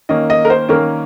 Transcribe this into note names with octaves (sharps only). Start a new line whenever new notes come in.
D#3 A#3 C#4 D#5
D#5
A#4
C5
D#3 A#3 C#4 A#4